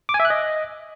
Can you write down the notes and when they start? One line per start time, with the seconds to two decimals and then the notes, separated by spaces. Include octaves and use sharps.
0.09 D6
0.14 G#5
0.20 E5
0.25 F#6
0.30 D#5